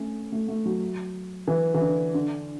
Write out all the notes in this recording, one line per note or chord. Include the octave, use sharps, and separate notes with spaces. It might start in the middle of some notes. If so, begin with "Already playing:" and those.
Already playing: A3 C#4
A3
A3
F#3
E3
E3
D3
D3